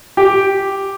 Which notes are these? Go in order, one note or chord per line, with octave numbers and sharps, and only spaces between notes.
G4